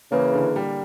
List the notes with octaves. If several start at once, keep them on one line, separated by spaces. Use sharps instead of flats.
C#3 E3 A#3
D3
G3